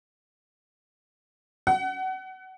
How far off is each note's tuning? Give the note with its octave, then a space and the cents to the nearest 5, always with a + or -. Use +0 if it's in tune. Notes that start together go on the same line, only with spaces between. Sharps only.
F#5 +25